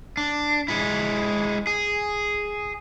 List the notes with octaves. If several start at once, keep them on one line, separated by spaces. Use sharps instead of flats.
D4
G#3 E4
G#4